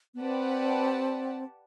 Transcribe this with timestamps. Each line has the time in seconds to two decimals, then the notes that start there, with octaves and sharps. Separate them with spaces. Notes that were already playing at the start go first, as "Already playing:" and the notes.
0.14 B3
0.21 C4 G4 B4 D5 F#5 A5